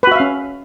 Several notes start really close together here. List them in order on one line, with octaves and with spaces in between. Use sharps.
B4 F#4 E5 F5 C#4